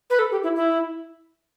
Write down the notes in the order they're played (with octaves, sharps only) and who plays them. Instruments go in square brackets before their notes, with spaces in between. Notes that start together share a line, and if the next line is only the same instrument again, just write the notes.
[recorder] B4
A4
G4
E4
E4